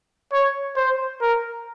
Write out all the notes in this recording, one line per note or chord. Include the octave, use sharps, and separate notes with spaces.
C#5
C5
A#4